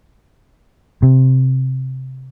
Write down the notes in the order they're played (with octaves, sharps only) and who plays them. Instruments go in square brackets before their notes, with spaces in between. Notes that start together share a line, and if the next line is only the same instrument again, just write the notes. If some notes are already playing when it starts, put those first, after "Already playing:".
[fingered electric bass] C3